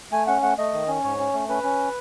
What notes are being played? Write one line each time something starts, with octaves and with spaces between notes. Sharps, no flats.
A3 G#5
C#4 F#5
A3 F#5
A3 D#5
D#3
C#4
G#2 C#5
C#4
A3
C#4 B4
C#4